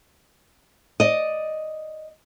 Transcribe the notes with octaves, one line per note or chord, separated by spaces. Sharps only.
D5 D#5